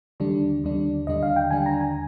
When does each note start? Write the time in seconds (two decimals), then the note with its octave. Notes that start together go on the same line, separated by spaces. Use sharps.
0.20 D#2 D3 G3 D4
0.64 D#2 D3 G3 D4
1.07 D#2 D3 G3 D4 D#5
1.23 F5
1.36 G5
1.51 D#2 D3 G3 D4 G#5
1.66 A#5
1.81 G#5